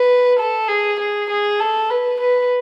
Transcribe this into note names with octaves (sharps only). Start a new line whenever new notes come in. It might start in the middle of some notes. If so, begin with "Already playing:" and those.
Already playing: B4
A4
G#4
G#4
G#4
A4
B4
B4